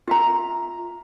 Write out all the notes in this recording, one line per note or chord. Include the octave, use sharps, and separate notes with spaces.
F4 E5 A#5